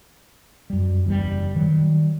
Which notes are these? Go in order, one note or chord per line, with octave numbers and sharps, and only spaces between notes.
F#2 G3
F#1 E2 A2 G3
D#3 F#3 G3